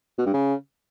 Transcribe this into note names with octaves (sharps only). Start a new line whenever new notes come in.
B2
G2
C#3